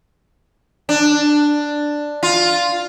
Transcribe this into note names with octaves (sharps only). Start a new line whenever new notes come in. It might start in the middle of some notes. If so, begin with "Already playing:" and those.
D4
F4